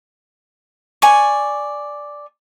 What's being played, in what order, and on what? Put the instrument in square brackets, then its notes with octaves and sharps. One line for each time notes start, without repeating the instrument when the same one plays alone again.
[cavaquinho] D5 G#5 C#6